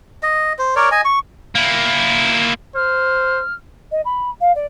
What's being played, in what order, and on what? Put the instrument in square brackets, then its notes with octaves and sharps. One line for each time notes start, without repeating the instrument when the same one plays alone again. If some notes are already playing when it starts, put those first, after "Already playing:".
[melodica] D#5
C5
A#4 C#5 D5
D#5 G#5
C#6
[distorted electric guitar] A#3 E4
[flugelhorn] C5 [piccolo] F6
[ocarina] D#5
B5
F5
D5